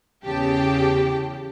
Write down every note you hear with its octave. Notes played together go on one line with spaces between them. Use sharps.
E2 C#3 G4 G5 A5